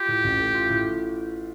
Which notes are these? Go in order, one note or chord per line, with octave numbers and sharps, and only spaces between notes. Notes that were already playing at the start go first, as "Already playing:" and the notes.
Already playing: F4 G4
A2
A1
A3
F4
A2